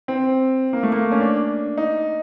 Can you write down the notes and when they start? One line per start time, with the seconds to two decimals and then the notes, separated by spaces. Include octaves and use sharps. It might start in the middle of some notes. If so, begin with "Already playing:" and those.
0.08 C4
0.73 A#3
0.83 A3
0.92 A#3
1.12 C#4
1.21 D4
1.78 D#4